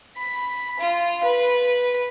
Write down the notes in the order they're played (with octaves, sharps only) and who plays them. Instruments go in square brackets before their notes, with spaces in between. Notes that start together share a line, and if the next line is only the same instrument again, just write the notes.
[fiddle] B5
F4
B4